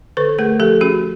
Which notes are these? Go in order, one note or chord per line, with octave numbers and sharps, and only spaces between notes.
D3 A4 B4
A3 G#4 A#4
F3 G4 A4
C#4 F#4 G#4